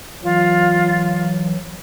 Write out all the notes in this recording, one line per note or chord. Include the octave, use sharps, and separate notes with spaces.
E3 F#3 F4